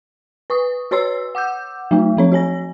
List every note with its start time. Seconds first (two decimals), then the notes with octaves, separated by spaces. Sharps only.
0.50 B4 C#6 D#6
0.91 F#4 B4 C#5 C6 E6 C7
1.35 F#5 D6 E6 G6
1.91 F#3 A3 D#4
2.17 F3 C4 C#5
2.32 F#4 C#5 G#5 A#6